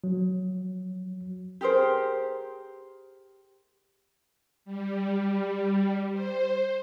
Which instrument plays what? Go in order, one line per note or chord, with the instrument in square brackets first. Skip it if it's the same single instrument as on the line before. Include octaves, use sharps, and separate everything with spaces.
[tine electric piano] F#3
[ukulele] G4 G#4 A#4 C5
[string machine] G3
C5